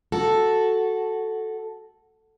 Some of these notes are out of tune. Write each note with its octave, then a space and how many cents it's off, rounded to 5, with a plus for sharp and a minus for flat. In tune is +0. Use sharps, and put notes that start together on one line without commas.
F#4 +0 A4 -5